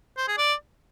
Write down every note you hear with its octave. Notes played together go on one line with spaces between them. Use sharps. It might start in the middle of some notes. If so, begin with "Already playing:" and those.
C5
G#4
D5